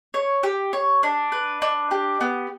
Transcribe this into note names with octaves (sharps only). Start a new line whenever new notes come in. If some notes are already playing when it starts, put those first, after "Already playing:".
C#5
G4
C#5
D4
B4
D4
G4
B3